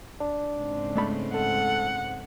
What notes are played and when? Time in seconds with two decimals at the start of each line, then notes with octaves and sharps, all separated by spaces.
0.21 D4
0.58 G#2 C#3 C4
0.95 G#3 A3 B5
1.34 A4 F#5